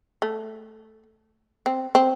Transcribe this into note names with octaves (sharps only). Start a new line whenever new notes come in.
A3
C4
C4